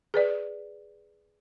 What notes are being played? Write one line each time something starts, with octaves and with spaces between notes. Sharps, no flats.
G#4 B4 D5